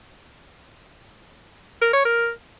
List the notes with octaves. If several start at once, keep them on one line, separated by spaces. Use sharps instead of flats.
A#4
C#5
A#4